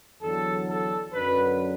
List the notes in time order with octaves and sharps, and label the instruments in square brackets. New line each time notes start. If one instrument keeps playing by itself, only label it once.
[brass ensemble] E2 D3 F#3 A4
A4
F#2 D3 F#3 B4